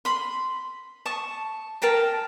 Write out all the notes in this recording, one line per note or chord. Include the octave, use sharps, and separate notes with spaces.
B5 C6
A5 C#6 D#6
A#4 G5 A5 A#5